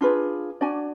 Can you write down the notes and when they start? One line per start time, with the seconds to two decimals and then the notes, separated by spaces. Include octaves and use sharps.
0.01 D4 F4 G#4 B4
0.61 D4 F#4 D5 G#5